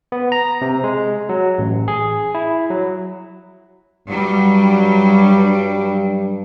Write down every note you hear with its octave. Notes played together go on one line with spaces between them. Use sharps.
B3
A#5
C3
G#3
F#3
A1
G#4
E4
F#3
G2 F#3 G3